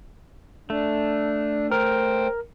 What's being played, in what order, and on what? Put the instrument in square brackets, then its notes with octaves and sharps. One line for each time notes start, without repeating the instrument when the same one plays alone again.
[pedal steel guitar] A3 [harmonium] D4
[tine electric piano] A#4 [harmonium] C5 G5